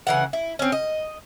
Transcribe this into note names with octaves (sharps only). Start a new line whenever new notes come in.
C#3 E3 F#5
E4
C4 C#4
D#5